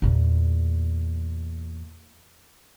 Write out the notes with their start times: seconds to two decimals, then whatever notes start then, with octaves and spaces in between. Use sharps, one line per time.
0.02 E2 A#2